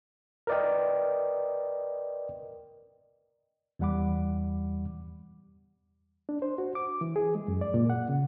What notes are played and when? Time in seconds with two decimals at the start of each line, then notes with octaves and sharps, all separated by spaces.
0.47 A#4 B4 D5 D#5 G5
3.79 E2 E3 G3 F#5 B5 D6
6.29 D4
6.42 C5
6.58 F#4
6.75 D6
7.01 E3
7.16 G#4
7.35 G#3
7.48 F#2
7.61 D5
7.74 A#2
7.90 F#5
8.09 C#3